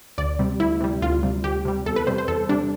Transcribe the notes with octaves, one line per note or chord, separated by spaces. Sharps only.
D2 D5
C3 G3
D2 E4
C3 G3
D2 F4
C3 G3
D2 G4
C3 G3
E2 A4
B4
C3 G3 C5
C5
E2 A4
C3 G3 D4